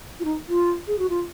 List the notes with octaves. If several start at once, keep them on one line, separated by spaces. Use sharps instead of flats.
F4
D#4
F4
G#4
F#4
F4